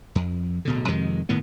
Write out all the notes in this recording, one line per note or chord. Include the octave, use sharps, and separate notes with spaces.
F2
D1 B2 D3
F2 C3 D#3 G#3
G1 A2 D#3 B3